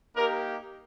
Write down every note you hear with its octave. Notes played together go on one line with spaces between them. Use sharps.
A#3 D#4 G4 A#4